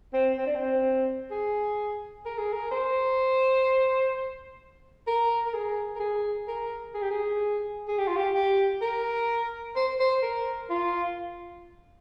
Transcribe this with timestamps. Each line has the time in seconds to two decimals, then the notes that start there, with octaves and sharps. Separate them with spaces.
0.13 C4
0.37 C4
0.46 D4
0.55 C4
1.31 G#4
2.25 A#4
2.38 G#4
2.53 A#4
2.71 C5
5.07 A#4
5.46 A#4
5.54 G#4
5.95 A#4
5.99 G#4
6.48 A#4
6.94 G#4
7.02 G4
7.10 G#4
7.88 G#4
7.98 G4
8.07 F4
8.17 G4
8.34 G4
8.81 A#4
9.76 C5
10.00 C5
10.22 A#4
10.70 F4